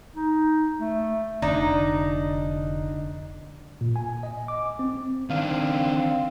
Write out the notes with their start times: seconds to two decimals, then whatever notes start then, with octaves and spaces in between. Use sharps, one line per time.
0.16 D#4
0.80 A3
1.42 F1 D3 D4 D#4
3.81 A#2
3.96 G#5
4.23 D#5
4.48 D6
4.79 C4
5.30 D#3 C4 D4 F5